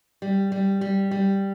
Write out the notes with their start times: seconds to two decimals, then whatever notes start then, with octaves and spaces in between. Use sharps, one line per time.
0.22 G3
0.52 G3
0.81 G3
1.11 G3